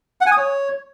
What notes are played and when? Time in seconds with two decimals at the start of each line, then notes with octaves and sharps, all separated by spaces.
0.21 F#5
0.26 G#5
0.32 D#6
0.37 C#5